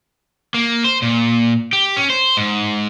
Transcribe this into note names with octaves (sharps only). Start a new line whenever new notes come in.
A#3
C5
A#2
G4
C#4
C5
G#2